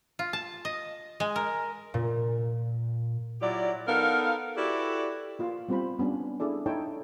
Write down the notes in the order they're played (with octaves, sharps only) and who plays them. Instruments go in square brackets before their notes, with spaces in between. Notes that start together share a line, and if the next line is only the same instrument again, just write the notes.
[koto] F4
A5
D#5
G#3
A#4
[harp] A#2
[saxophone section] F#3 E4 F4 G4 D5
B3 D#4 A4 A#4 F5
E4 F#4 G4 A4 B4 D5
[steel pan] A#3 F4 F5
G3 B3 C4 F4 C5 B5
G3 B3 C#4 D4
D4 E4 G#4 A4 D5
D#4 E4 A4 C#5 G5 A5